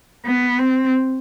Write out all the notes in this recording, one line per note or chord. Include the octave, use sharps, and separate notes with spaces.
B3
C4